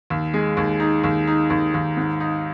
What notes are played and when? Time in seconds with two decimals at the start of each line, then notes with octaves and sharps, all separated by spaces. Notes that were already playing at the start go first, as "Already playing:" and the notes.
0.10 D#2
0.34 G#3
0.57 D#2
0.80 D#4
1.04 D#2
1.27 D#4
1.50 D#2
1.74 D#2
1.97 G#2
2.20 D#4